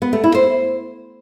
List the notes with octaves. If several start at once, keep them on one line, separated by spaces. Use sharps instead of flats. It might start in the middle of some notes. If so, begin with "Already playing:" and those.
B3
A3
E4
C5